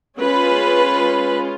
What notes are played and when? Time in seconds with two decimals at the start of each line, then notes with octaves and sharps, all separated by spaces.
0.19 G#3 C#4 F4 B4